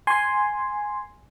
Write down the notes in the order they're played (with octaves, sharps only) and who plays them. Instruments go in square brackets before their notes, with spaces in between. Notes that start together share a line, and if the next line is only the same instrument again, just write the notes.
[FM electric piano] G#5 C6